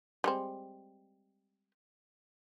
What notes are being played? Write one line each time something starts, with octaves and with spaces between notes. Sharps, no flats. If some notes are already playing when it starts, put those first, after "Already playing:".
G3 G#3 C4